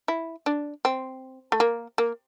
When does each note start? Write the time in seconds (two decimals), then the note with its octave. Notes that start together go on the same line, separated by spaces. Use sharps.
0.08 E4
0.46 D4
0.85 C4
1.52 A3
1.60 A#3
1.98 A#3